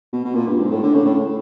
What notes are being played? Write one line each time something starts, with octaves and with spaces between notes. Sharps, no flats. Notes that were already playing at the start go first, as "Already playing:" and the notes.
B2
B2
A#2
G2
G#2
A2
D3
C#3
A2